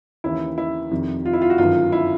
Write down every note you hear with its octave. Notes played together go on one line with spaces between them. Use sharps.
D#2 C#3 E3 E4
E4
F1 F2 C3 D#3
F4
E4
F4
F#4
G1 F#2 D#3 F4
E4